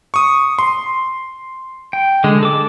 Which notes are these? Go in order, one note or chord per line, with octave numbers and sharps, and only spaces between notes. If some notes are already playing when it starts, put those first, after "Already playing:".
C#6 D#6
C6
G5
D3 G#3
A4 D6